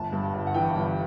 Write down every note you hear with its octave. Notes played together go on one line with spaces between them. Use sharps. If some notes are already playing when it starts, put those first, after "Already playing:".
Already playing: G1 A5
G2
G1
F#5
E3 G5
G1